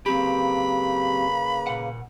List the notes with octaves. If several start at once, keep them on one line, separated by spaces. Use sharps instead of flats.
C#3 F#3 A#3 C4 G4 B4 B5
A#2 F#5